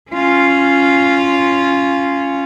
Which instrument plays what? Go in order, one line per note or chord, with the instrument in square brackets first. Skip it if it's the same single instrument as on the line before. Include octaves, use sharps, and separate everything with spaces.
[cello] C#4 F4